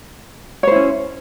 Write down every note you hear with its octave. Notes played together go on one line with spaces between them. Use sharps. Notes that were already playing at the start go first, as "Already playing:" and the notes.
C#4 E4 C5 C#5